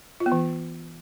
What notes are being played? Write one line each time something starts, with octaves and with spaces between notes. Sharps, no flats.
F4
B3
E3